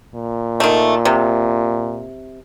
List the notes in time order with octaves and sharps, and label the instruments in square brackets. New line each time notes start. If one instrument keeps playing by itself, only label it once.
[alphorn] A#2
[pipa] D#3 A3
C3